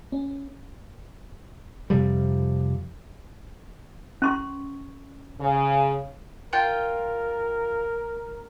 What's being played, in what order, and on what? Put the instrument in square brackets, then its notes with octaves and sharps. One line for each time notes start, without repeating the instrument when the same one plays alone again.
[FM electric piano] C#4
[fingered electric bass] F2 C3 F3 G3
[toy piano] C#4 C6 C#6
[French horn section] C#3
[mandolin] F4 G5 [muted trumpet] A#4